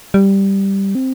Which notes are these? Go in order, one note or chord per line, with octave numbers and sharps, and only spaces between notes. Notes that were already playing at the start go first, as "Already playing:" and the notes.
G3
C4